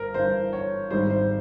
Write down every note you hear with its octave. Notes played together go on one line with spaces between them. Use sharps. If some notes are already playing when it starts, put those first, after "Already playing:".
Already playing: G1 G2 A#4 C5
G1 G2 E3 C5
C#5
G#1 G#2 G3 C5
C5